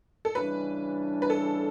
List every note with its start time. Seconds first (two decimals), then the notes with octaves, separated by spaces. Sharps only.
0.25 A4
0.35 C#3 E3 G3 D4 B4
1.22 B4
1.30 A4